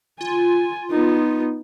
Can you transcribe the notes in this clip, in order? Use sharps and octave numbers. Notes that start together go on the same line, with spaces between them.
F4 G#5
B3 D#4